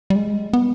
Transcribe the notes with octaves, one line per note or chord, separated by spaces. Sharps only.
G3
G#3
B3